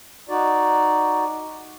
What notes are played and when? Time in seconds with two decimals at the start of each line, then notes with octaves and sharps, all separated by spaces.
0.29 D#4 F#4 D5